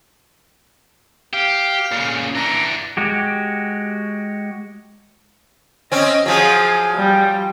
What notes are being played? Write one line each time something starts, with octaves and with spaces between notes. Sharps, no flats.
G4 F5
A#2 C#3
E3 D4 A#5
G#3 F#4 G4
C4 C#4 D#5
F3 F#3 G#4
G3